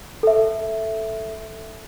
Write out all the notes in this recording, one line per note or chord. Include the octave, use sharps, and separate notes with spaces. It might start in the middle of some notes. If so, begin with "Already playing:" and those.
A4 E5